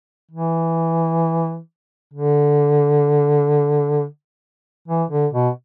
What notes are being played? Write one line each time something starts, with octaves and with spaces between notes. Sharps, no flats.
E3
D3
E3
D3
B2